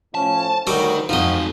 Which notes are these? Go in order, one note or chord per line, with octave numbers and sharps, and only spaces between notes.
A2 F3 C#4 A5
D2 D#3 F#3 G3 D#4 A#4 D6
F2 F3 C4 D#4 F#4 D#5